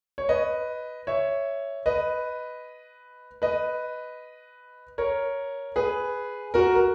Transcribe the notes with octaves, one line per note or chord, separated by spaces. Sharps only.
C#5
B4 D#5
C#5 E5
B4 D#5
B4 D#5
A#4 C#5
G#4 B4
F#4 A#4
A#4